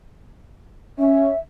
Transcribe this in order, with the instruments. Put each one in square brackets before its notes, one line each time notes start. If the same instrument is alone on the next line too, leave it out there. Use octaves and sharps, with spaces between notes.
[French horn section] C#4 [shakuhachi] E5